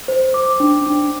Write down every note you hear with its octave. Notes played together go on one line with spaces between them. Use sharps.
C5
D6
D4
D4